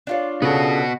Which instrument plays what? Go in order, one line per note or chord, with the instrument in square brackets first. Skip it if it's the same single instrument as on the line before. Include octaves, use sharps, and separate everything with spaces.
[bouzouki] D4 F4 C#5
[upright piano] C#3 A4 [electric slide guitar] B3 F#4